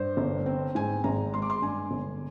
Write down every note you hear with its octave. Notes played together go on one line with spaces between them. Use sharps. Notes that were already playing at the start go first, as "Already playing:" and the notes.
Already playing: G2 C5
G1
C4
G#2 G#5
G#1 A#5
G#3 C6
D6
C6
G2 G#5
G1